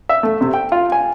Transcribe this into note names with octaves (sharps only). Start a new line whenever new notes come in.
E5
A3
C3
G5
F4
G#5